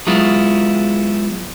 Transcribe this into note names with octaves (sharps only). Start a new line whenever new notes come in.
F#3 G#3 B3 E4 F4